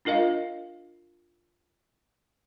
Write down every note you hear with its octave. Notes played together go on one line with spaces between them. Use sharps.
D4 F4 A#4 D#5 F5